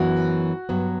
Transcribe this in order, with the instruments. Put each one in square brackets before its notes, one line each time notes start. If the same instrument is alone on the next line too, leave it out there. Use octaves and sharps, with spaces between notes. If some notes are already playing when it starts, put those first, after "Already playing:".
Already playing: [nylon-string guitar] F#2 E3 B3 [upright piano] F#4
[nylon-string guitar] G2 F#3 B3